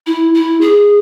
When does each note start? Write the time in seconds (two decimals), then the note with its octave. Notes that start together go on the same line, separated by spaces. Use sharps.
0.06 E4
0.34 E4
0.61 G#4